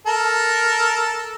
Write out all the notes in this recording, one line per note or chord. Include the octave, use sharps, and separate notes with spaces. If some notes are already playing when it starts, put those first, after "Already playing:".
A4 A#4